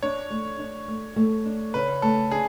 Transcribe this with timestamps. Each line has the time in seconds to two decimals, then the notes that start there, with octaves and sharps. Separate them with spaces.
0.03 D4 C#5
0.30 A3
0.59 D4
0.88 A3
1.16 A3
1.45 D4
1.74 C#3 B4
2.02 A3 A4
2.31 D4 G#4